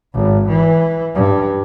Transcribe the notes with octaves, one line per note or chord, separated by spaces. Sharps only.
G#1
E3
G2